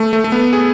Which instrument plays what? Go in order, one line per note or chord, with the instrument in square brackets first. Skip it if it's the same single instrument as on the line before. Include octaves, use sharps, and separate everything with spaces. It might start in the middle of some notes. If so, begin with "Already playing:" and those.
Already playing: [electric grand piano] A3
A3
A3
B3
G#4